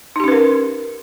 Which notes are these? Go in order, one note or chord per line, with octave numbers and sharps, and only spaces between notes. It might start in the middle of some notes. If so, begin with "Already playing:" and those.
C#4 D#4 G4 A#4 B4